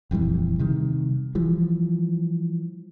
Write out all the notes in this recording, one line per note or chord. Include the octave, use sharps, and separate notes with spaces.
D#1 F2 E3 G3
C3 D#3 G3
E3 F3 G3